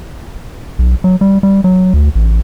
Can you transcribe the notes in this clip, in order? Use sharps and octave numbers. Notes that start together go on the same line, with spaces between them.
B1
F#3
G3
G3
F#3
D2
A1